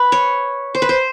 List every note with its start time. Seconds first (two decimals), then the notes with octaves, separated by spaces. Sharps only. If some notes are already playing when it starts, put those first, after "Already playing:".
Already playing: B4
0.12 C#5
0.75 C5
0.82 B4
0.89 C5